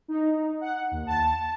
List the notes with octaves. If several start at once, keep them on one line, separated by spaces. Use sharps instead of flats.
D#4
F#5
D#2
A5